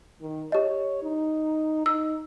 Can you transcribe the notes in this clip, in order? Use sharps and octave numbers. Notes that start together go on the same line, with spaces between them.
D#3
G4 C#5 D#5
D#4
D#4 E6